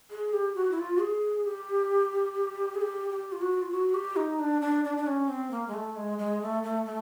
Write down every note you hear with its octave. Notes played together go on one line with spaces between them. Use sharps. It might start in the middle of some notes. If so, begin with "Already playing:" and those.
G#4
G4
F#4
E4
F4
G#4
G4
G#4
G4
G4
F4
F#4
F4
F#4
G4
D#4
D4
D4
D4
D4
C#4
C4
A#3
G#3
A3
G#3
G#3
A3
A3
A3